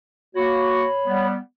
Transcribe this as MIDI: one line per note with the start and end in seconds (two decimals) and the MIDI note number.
0.36 0.86 58
0.36 0.86 66
0.36 1.27 73
0.36 1.27 83
1.06 1.37 55
1.06 1.37 59